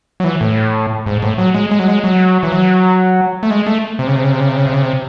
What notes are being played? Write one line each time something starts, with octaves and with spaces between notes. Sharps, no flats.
F#3
E3
A2
G#2
A2
F#3
G#3
G#3
F#3
G#3
F#3
E3
F#3
A3
G#3
A3
C3
C#3
C3
C#3
C3
C#3
C3
C#3
C3
C#3
C3